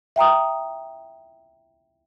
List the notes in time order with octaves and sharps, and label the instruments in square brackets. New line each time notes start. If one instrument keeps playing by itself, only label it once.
[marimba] E5 G5 A#5 D#6